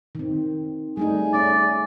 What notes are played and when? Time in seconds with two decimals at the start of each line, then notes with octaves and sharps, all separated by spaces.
0.15 D#3 C4
0.97 G3 A3 D#4 G#4
1.34 C#4 D5